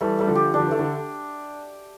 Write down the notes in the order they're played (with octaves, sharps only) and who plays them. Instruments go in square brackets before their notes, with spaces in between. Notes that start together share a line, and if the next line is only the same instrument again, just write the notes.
[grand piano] E3 G3 [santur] A3
[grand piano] G3 [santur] A3
[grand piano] D3 F3
[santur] G4
[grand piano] D3 [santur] D4
[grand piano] F3
[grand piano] E3 [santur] A3
[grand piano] D3